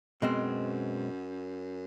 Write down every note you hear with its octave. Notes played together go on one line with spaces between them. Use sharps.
F#2 B2 G#3 C4